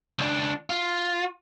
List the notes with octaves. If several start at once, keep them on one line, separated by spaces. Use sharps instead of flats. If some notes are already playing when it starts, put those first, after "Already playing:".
C#2 D4
F4